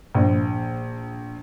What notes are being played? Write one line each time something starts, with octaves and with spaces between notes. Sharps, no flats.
A#1